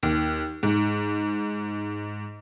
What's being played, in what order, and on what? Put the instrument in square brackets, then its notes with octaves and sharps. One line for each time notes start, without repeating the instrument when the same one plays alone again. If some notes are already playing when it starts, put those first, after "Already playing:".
[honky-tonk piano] D#2
G#2